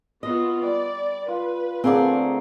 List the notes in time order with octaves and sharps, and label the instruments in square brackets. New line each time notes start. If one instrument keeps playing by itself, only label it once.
[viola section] B3 F4 F#4 [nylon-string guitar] D#5
[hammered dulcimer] G3 [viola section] D5
[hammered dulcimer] F4 [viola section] B4
[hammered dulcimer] D3 A3 A#3 [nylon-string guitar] C4 G#4 D5